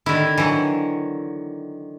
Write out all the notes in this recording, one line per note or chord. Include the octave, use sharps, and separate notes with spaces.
D3 D#3 E4
E3 F#3